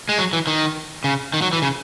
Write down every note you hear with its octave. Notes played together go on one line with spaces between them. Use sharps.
G#3
F#3
E3
D#3
C#3
D#3
F#3
E3
C#3